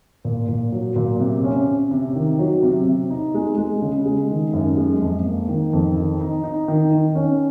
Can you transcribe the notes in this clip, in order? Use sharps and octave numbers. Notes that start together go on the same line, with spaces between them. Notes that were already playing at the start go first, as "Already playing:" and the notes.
A#2
A#2
F#3
A#2
C3
C#4
C3
C3
D#3
F#3
C3
C3
D#4
G#3
G#3
C#3
G#3
D#3
F#2
G#3
F2
A#3
D#3
F2
D#3
D#4
D#4
D#3
D#3
C#4